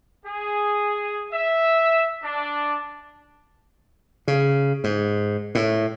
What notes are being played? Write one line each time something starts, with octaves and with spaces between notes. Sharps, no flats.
G#4
E5
D4
C#3
G#2
A2